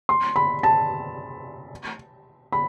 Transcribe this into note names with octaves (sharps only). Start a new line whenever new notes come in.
C6
B5
A5
B5